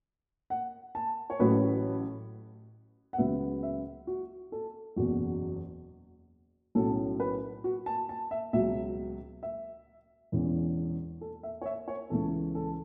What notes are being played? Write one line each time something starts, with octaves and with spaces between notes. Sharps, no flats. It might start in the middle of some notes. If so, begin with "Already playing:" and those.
F#5
A5
C#5
A1 A2 F#3 A3 C#4 B4
F#5
C#2 C#3 F#3 B3 E5
E5
F#4
A4
F#1 E2 B2 F#4
B1 A2 F#3 C#4 A4
B4
F#4
A5
A5
E5
C#2 B2 F#3 E5
E5
E1 E2 E3 C#4
A4
E5
C#5
E5
C#5
C#2 C#3 E3 B3 A4
A4